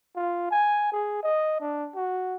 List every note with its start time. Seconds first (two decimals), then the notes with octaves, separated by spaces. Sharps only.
0.16 F4
0.51 G#5
0.92 G#4
1.23 D#5
1.61 D4
1.95 F#4